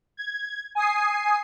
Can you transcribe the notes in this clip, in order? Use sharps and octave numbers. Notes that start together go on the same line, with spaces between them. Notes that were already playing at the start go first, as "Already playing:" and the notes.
G#6
G#5 D#6 C7